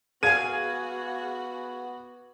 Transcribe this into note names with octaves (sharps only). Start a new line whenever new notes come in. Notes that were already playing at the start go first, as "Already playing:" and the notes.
B3 F#4 G#4 F5 G#5 G#6 D#7